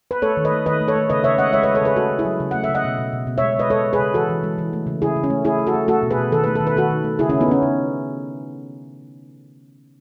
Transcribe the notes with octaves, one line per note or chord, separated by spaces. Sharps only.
B4
A3 A4 C#5
D#3
B4 D#5
A3
D#3 B4 D#5
A3
A4 C#5
A3
C#3 B4 D#5
C#3 C#5 E5
G#3 D#5 F#5
G#3 C#5 E5
B4 D#5
G#3
A4 C#5
C#3 G#4 B4
A3 F#4 A4
C#3
E4 G#4
F#3
C#3
A3 F#5
E5
C#3
D#5 F#5
B2
B2
B2
B2
C#5 E5
G#3
G#3 B4 D#5
G#3 A4 C#5
G#3
G#4 B4
C#3
E3 F#4 A4
E3
G#3
E3
A3
C#3
C#3 E4 G#4
C#3
C#4
A3
A3 E4 G#4
A3
F#4 A4
A3
A3 F#4 A4
B2
G#4 B4
B2
D#3 A4
A3 B4
A4
D#3
B4
D#3 F#4 A4
D#3
A3
C#3 E4 G#4
C#4 E4
C#3
B3 D#4
C#3 C#4
C#3